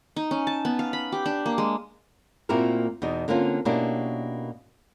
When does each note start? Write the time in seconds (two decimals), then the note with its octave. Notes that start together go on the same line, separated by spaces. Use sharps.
0.16 D#4
0.31 C#4
0.47 A5
0.65 B3
0.79 F5
0.93 B5
1.12 G4
1.26 D4
1.46 A#3
1.58 G#3
2.49 A#2 A#3 C4 E4 F#4 A#4
3.02 E2 B2 D#4 D#5
3.28 D3 A#3 C4 C#4 F4
3.65 B2 A#3 C#4 D4 E4 G4